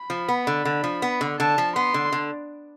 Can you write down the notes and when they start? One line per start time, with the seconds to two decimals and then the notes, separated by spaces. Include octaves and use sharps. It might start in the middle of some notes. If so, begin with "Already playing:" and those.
Already playing: B5
0.10 F3
0.28 B3
0.47 D3
0.65 D3
0.84 F3
1.02 B3
1.21 D3
1.39 D3 A5
1.58 F3
1.76 B3 C6
1.94 D3
2.12 D3